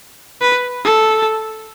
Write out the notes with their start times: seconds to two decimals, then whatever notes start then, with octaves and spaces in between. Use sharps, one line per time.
0.41 B4
0.85 A4